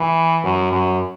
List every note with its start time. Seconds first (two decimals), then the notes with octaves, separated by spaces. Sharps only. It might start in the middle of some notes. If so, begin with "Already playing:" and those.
Already playing: E3
0.44 F#2
0.72 F#2